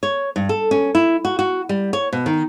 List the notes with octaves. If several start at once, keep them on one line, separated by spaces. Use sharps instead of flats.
C#5
G2
A4
C#4
E4
F#4
F#4
G3
C#5
B2
D#3